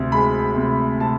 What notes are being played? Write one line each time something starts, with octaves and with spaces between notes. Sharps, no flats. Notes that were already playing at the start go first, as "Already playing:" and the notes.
Already playing: D2 C3
G#3 B5
C3
C3 A5